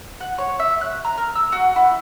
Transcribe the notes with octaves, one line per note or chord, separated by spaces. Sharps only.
F#5
C#5
E5
F#6
A#5
A#4
E6
F#4
E4